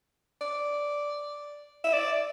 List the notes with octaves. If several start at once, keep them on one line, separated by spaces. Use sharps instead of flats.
D5
E5
D5